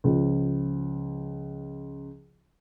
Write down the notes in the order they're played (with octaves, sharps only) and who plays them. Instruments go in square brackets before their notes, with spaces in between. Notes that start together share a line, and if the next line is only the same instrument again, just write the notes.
[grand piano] C#2 F3